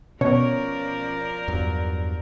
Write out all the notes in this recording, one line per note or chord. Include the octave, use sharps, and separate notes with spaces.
B2 F3 C#4 A#4 C#5 D5
E2 G2 F#3